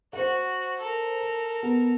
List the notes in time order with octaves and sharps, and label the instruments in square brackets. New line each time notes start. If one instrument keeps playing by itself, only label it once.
[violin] F#4 [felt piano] C5 F#5
[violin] A4 A#4
[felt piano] B3